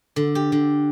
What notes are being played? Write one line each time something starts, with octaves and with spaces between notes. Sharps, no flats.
D3
G4
D3